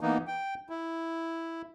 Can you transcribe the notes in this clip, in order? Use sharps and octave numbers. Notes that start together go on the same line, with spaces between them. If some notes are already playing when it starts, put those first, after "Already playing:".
E3 A#3 B3 D#4
G5
E4